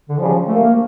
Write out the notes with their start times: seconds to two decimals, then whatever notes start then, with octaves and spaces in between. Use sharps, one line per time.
0.09 D3
0.18 C#2 C#3 F3 G3
0.29 F3
0.48 D3 G3 A3 A#3
0.63 A#3